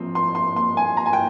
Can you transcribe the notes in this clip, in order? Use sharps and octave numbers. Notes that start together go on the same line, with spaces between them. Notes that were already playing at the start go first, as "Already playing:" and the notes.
Already playing: F3 C4 C6
C6
C6
C6
G#5
A#5
G#5
G5